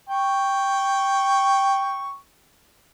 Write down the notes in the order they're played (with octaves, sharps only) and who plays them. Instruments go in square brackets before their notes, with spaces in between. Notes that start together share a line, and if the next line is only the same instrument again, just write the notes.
[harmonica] G5 C#6